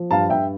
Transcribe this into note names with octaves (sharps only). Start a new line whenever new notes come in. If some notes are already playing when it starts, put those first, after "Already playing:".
Already playing: F3
G2 F5 A5
G2 E5 G5